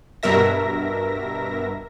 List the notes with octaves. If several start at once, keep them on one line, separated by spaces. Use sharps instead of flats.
G2 B2 A#4 E5 A#6